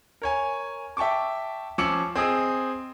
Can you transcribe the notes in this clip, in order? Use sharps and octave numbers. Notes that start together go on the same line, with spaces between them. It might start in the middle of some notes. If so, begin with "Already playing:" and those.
A#4 C#5 G#5
E5 G5 A5 C#6 D6
F3 C#4 D6 E6 C#7 F#7
C4 G#4 D#5 D#6 E6